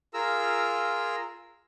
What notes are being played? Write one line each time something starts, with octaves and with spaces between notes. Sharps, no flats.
F4 G#4 A#4 A#5 E6